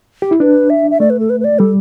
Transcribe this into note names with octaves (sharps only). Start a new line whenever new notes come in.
G4
E4
D4 B4
E5
E5
A3 D5
B4
A4
B4
B4
D5
G3 A4